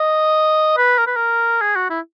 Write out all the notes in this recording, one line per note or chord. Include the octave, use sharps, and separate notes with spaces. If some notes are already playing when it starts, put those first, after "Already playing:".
Already playing: D#5
B4
A#4
B4
A#4
G#4
F#4
E4